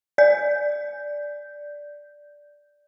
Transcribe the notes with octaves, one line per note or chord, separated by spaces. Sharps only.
D5 G6